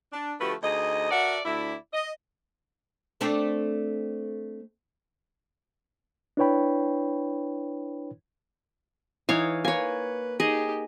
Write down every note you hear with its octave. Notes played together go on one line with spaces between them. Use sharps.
D4
D3 F3 A3 F#4 G4 B4
D2 D#4 G#4 D#5
F#4 A4 A#4 D5 E5 F#5
D2 E4 D5
D#5
A3 C4 D4
D4 E4 B4 C#5 G5 B5
E3 D#4 C#5 F5
A#3 B4 C#5 G#5
D#4 G4 G#4 D#5